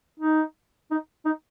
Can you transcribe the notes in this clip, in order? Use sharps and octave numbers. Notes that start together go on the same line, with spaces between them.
D#4
D#4
D#4